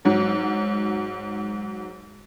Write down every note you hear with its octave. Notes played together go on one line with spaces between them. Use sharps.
G#2 F#3